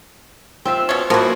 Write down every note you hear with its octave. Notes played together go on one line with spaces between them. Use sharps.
C4 F4 E5
B2 C#4
E3 F3 A#3 F#4 B4